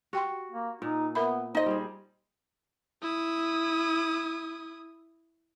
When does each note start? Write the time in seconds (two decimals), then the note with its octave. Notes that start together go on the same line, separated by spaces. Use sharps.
0.13 F#4 G4 G5 C6
0.52 A#3
0.82 A#2 D#4
1.15 B3 A#4 E5 B5
1.55 D#4 C5 D#5
1.66 G3 G#4
3.02 E4 D#6